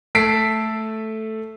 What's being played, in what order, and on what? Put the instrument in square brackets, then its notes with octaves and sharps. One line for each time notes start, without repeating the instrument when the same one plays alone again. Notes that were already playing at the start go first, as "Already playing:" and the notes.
[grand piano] A3 A4 A5 B6 C7 D7